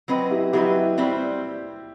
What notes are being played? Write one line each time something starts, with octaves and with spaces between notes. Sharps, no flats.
F#3 C4 F#4 B4 D#5
E4 G4
F#3 C4 E4 F#4 G4 B4 D#5
G3 C4 F#4 C5 E5